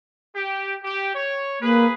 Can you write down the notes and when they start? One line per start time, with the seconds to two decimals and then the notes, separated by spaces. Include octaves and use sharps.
0.35 G4
0.83 G4
1.14 C#5
1.61 A#3 G#4 B4